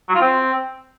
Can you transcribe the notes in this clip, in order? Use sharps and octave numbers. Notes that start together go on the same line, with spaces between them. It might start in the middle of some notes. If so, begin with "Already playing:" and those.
F#3
F4
C4